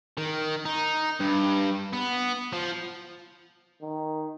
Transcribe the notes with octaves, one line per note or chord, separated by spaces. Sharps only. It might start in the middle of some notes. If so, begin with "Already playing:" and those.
D#3
D#4
G2
B3
F3
D#3